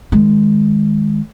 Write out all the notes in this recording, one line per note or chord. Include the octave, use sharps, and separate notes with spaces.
D#3 G#3